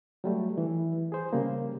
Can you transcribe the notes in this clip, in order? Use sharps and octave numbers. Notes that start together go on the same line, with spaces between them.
F#3 G3 A3
E3
G#4 C5
C#3 G3 A#3